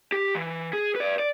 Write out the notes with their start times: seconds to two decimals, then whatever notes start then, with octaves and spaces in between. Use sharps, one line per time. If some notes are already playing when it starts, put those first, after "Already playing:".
0.12 G4
0.35 E3
0.73 G#4
0.96 B4 D5
1.19 D5